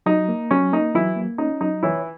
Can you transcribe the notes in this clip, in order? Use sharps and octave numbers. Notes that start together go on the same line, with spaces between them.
F#3 D#4
A#3
F#3 C#4
A#3 D#4
E3 F#3 E4
A#3
C#4 D#4
F#3 D#4
E3 E4 C#5